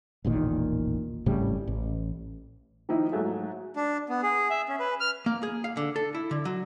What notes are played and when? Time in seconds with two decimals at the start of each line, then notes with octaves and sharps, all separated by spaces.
0.24 E1 A1 A#2 D#3
1.26 G#1 A2 C#3 G3
1.67 A1
2.89 D#3 F3 A#3 D#4 E4
3.12 G#2 F#3 A3 G#4 E5
3.76 D4
4.09 B3
4.23 G#4
4.50 E5
4.68 C#4
4.80 B4
5.00 F6
5.26 A#3
5.43 G#4
5.64 F5
5.77 D3
5.96 A4
6.15 E4
6.31 D3
6.45 F#3